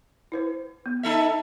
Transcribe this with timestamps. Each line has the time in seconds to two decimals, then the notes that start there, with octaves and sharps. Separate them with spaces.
0.32 E4 B4 C5
0.86 B3
1.03 D#4 A4 E5